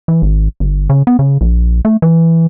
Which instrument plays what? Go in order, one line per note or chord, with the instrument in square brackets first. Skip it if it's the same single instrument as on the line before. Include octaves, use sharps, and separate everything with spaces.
[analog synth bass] E3
G#1
G1
C#3
B3
C#3
A#1
A3
E3